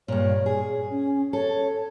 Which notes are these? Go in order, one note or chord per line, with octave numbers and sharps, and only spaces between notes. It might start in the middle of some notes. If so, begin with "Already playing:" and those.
G2 A#2 C#5
G#4
C#4
A4 C#5